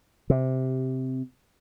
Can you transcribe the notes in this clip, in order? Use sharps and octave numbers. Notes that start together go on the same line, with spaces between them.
C3